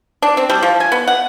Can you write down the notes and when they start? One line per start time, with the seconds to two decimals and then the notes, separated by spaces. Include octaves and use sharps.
0.22 D4
0.37 C4
0.50 G3
0.63 F3
0.80 G#5
0.92 B3
1.07 F#5